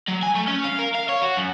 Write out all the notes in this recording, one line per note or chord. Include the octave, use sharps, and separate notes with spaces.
F#3
G#5
A3
C#4
F5
A#4
F5
C#5
F#4
F#2